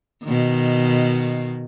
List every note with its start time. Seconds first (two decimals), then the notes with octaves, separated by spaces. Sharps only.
0.24 B2 D#3